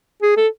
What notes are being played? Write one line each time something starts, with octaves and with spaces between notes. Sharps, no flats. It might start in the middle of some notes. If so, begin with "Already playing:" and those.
G#4
A4